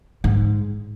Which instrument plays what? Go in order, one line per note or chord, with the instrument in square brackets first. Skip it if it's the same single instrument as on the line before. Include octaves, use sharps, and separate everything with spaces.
[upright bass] G#2